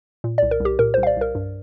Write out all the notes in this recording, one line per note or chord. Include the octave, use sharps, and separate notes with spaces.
A#2
D5
C2
A#4
C2 G4
A#2 A#4
C5
C2
F5
D5
C2 A#4
G2